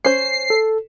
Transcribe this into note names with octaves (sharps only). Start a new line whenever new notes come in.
C#4 C5 C7
A4